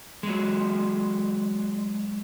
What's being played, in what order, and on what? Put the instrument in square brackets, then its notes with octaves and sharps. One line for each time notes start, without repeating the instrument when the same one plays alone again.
[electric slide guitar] F#3 G#3